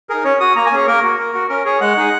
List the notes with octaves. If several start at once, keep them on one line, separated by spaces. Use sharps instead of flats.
D#4 G#4 A#4
C#4 C#5
F#4 D#6
A#3 A#5
G#5
C#4 G#4 C#5
A#3 A#4
F#4
A#3
F#4
C#4 A#4
G#4 C#5
G#3 F#5
D#4 G#4